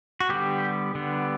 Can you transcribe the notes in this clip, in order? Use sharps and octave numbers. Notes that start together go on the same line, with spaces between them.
F#4
D3 G3 B3 G4
D3 G3 B3